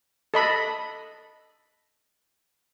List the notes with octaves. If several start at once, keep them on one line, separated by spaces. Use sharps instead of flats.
A4 D#5 B5